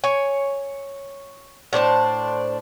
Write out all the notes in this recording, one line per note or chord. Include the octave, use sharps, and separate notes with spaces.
C#5 G#5
A2 D4 C5 A5